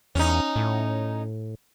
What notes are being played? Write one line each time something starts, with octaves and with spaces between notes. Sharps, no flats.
E2 C#4 D#4
A2